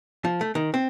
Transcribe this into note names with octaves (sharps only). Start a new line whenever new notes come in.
F3
A3
D#3
C4